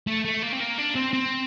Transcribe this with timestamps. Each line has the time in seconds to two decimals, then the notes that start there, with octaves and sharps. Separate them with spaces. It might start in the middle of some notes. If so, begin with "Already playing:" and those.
0.07 A3
0.25 A3
0.42 A#3
0.52 C4
0.60 A#3
0.78 D4
0.95 C4
1.13 C4